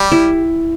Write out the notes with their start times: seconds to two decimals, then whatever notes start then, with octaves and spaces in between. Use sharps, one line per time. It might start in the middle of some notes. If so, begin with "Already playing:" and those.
Already playing: G3 G4
0.12 E4